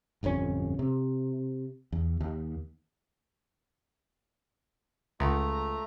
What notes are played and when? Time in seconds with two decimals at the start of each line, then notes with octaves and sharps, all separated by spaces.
0.23 D1 G1 F2 C#4
0.79 C3
1.92 E2
2.20 D#2
5.20 C#2 A3 A#5